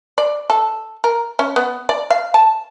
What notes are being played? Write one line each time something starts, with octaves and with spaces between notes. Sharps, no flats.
D5
A4
A#4
C#4
B3
D5
F5
A5